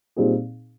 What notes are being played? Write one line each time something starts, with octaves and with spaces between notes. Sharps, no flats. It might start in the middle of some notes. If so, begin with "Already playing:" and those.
A#2 G3 C4 D#4 G#4